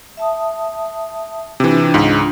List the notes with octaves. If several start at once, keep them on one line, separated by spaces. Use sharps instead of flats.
E5 A5 D#6
C3 E3 D4 F4
C#2 G#2